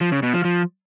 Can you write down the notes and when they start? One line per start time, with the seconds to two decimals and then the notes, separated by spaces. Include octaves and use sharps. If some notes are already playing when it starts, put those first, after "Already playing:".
0.01 F3
0.12 C#3
0.23 B2
0.34 F3
0.45 F3